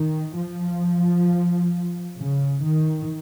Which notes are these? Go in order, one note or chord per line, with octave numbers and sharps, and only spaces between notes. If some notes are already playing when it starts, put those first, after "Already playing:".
Already playing: D#3
F3
C#3
D#3